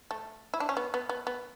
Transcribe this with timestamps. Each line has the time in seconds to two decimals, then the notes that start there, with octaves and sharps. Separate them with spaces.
0.11 A3
0.54 E4
0.60 D4
0.69 C#4
0.77 B3
0.94 B3
1.09 B3
1.27 B3